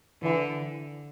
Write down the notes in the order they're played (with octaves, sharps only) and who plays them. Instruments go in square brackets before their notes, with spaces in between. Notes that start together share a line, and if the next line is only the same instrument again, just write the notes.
[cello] D3 [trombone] E3